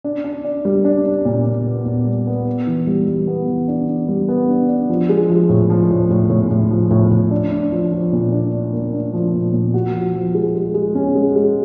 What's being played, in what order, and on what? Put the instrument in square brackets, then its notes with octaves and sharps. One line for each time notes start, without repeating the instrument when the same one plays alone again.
[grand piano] D4
D4
D4
G3
D4
D4
A#2
A#2
B3
A#2
G3
B3
B3
E3
G3
G3
B3
E3
D4
D4
G3
B3
D4
D4
F3
G#3
F3
A2
F3
A2
A2
A2
A2
F3
A2
A2
D4
D4
F3
F3
A#2
D4
D4
A#3
D4
F3
A#2
A#2
F#4
F3
F3
G#3
G#3
G#3
C#4
G#3
G#3